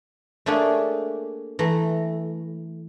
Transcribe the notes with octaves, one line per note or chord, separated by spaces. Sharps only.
A3 A#3 D4 G4 G#4 C#5
E3 A3 A#5